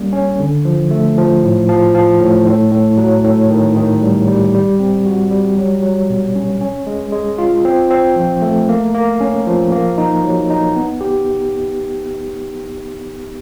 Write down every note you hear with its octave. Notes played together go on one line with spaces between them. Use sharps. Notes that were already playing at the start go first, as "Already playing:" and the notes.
Already playing: G3 A#3 C#4
C#4
D3
F3
A3
F3
A2
F3
F3
A2
A2
A2
F#3
A2
D#3
D#3
G3
G3
G3
C4
F#4
G3
F#3
F#3
B2
C#4
C#4
G#3
G#3
F4
C4
C4
F3
A3
A#3
A#3
C#4
F3
A#3
D#4
F#3
D#4
B3
G4